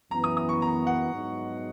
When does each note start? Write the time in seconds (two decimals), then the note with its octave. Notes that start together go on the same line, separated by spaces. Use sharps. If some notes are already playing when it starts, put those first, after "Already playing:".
0.11 F#2 E3 B3 A#5
0.24 D#6
0.37 D#6
0.49 C#6
0.62 A#5
0.87 F#5
1.12 G#2 F#3 B3 D#4